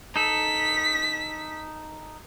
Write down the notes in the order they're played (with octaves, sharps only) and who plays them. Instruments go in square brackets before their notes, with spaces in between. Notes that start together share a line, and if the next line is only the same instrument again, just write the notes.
[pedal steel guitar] D#4 A4 [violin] B6